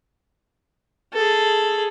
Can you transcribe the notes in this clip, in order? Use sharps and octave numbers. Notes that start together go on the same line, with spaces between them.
G#4 A4